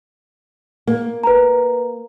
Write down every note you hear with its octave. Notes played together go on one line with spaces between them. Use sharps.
A#3
B4 A#5